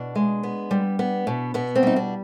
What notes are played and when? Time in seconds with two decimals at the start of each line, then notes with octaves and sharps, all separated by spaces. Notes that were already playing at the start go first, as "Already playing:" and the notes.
Already playing: B2 D4
0.15 G#3
0.43 B3
0.71 G3
0.99 B3
1.27 B2
1.54 B2 B3
1.76 C4
1.83 G3 D#4
1.96 D4